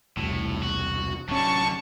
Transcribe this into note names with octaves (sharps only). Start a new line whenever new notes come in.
E1 C2 A2
F#4
D1 F#2 D3 C#4 A5 C#6